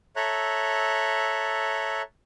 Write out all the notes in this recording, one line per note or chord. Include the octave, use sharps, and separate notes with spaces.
A4 C#5 E5 A#5 F#6